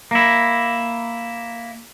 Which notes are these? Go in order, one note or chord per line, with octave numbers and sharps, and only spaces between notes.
A#3 E4